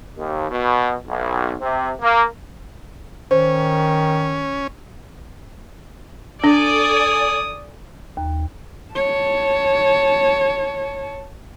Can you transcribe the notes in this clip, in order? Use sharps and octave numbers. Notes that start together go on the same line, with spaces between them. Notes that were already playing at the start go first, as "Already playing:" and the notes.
D#2
B2
B1
C3
A#3
D#3 C#4 C5
D4 A4 D5 G#5 D#6
D#2
C#5 A5